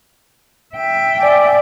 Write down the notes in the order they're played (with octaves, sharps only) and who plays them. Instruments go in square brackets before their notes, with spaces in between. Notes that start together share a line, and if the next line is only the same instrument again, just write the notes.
[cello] E5 G5
[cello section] D5 [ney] G#5